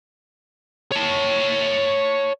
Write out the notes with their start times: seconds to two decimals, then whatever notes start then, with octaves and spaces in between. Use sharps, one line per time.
0.92 C#5 A5